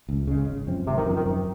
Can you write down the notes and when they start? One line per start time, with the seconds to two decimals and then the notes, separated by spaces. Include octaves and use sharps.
0.09 C#2
0.27 C#3 G#3
0.48 G#1
0.67 F#2 F3 C4
0.87 G#1 C3
0.97 D#3
1.06 F#2 F3 C4
1.16 D#3
1.26 F#2